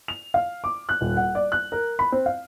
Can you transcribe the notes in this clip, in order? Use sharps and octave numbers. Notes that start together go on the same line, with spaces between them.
F7
F5
D6
F#6
D#1
F#5
D5
F#6
A#4
B5
C4
F5